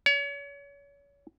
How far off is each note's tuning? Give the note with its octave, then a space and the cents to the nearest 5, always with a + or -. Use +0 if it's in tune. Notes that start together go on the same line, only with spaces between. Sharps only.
C#5 +35